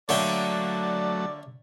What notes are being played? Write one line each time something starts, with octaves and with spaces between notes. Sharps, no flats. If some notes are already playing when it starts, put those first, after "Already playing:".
D3 F#3 A3 A#3 C#5 D5 E5 G5